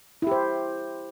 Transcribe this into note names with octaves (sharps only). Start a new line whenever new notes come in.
E4 G4 C5